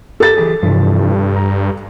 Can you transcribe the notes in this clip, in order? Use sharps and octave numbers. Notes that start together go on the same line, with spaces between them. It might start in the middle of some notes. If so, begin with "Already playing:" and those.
G4 A4 A6
E3 G4 G#4
G2 C3 E3 F3
A#5